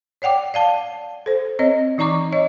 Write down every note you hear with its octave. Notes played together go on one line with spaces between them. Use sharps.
C#5 D5 F#5 G5 D6
D5 F5 A5
A4 C5
C4 C#5 D#5
E3 D#4 D5 A#5 C#6 D6
C#5 D#5